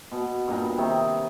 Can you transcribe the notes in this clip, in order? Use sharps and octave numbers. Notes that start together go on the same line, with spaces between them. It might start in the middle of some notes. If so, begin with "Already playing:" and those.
B2
G2 A#2 A#5
C3 D#3